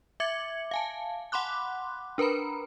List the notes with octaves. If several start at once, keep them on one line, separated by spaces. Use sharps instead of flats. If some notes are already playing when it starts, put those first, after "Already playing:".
E5 D6 G#6 C#7 F#7
F5 G#5 A5
F#5 B5 C6 D6 F#6
D4 A#4 B4 A#5 B5